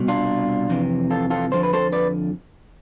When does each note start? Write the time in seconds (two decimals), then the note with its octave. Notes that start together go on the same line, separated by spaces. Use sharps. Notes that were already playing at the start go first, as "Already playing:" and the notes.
Already playing: C2 B2
0.08 D4 F4
0.69 F2 C3 E3
1.11 F4 A4
1.30 F4 A4
1.51 F2 D3 F3 C5
1.63 B4
1.73 A4 C5
1.93 B4 D5